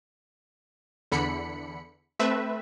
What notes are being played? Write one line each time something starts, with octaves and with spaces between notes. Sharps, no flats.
E2 D3 B5 C#7
A3 C4 B4 E5